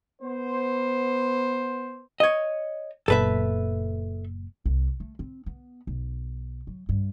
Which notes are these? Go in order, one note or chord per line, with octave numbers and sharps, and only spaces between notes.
B3 C5
C#5 D#5
F#1 A#2 B3 A4 B4 E5
C2
A3
C4
B3
B1
F#3
G2